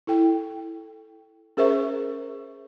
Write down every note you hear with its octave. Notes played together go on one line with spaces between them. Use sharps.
E4 A4 G5
C#4 G#4 A#4 C5 E5 C#6